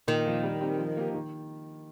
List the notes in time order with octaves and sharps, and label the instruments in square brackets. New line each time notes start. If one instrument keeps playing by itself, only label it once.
[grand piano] A#2 [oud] D#3
[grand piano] F3 A#3 F4
G3
C4 D#4 G4
F3
A#3 D#4 G4
D#3